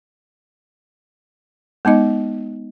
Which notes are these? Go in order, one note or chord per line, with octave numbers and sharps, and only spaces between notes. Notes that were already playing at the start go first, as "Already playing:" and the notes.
G#3 B3 D#4 D#5